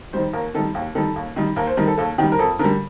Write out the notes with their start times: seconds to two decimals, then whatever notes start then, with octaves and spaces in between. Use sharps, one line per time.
0.13 D#3 G3 C5
0.33 D#2 A#4
0.54 D#3 A4
0.59 G3
0.75 D#2 G4
0.95 D#3 G3 A4
1.16 D#2
1.36 D#3 G3
1.56 D#2 A#4
1.67 C5
1.77 D#3 G3 A#4
1.88 A4
1.98 D#2 A4
2.18 D#3 G4
2.23 G3
2.32 A#4
2.39 F2 A4
2.59 D3 A#4
2.64 G3